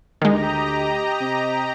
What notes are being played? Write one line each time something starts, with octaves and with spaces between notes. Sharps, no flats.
D2 D#3 G#3 G4 D#5 A#5
C3